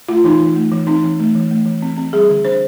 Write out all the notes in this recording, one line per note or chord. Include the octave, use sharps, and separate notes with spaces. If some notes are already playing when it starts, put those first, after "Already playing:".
A3 F4
E3 D#4
E3
A3
E3
C4 D#4
E3
A3
E3
A3
E3
C4
C4
G3 G#4
D3
D4 C5